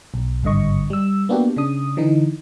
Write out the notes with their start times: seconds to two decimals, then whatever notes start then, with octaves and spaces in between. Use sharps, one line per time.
0.14 B1
0.43 G#1 G2 D3 D#5 C#6
0.90 G3 E6
1.29 A#3 B3 D4 F#4 G4
1.56 C#3 D4 D#6
1.97 D3 E3 D#4